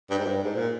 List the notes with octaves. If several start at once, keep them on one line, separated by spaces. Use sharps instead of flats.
G2
G#2
G2
G#2
A#2